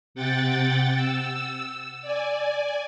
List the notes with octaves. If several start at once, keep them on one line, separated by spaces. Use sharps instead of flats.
C3 F#5 G5 A6
E6
D5 G#5